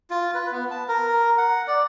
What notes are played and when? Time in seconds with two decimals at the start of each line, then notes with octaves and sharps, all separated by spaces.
0.10 F4
0.34 B4
0.52 B3
0.71 A5
0.88 A#4
1.38 F#5
1.67 D5